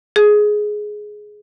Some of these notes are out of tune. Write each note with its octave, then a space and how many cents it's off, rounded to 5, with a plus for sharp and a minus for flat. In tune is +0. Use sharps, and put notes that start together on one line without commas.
G#4 +10